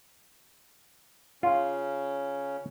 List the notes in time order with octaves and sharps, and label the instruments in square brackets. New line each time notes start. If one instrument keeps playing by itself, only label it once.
[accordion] C#3 C#4 [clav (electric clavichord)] F4